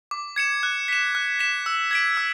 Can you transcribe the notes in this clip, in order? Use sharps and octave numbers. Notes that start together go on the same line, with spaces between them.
D6
G#6 C#7 E7
F#6
B6 E7
F#6
B6 E7
E6
G#6 B6 D7
E6